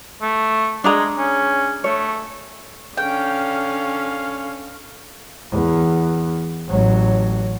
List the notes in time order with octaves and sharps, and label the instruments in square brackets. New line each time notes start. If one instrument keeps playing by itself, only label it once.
[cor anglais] A3
[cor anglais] G#3 [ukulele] D4 G#4 A#5
[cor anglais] C#4
[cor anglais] A3 [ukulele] C#5
[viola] D3 C#4 [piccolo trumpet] F5 [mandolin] G5
[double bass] E2
A1 F#3